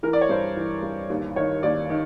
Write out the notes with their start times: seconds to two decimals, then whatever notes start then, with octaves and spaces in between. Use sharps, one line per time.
0.03 E3 A#4
0.13 D5
0.21 C#5
0.29 G2 C5
0.56 E3
0.82 G2
1.10 D#2
1.36 D#3 C#5
1.63 D#2 D5
1.90 D#3